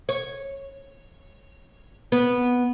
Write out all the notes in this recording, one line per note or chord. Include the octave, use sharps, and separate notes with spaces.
C#5
B3